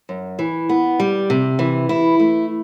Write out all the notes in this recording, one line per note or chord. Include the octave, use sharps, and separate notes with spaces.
F#2
E3
B3
G3
C3
E3
E4
A3